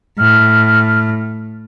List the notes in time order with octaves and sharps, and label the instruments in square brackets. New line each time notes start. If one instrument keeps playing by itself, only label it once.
[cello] A2 [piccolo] F6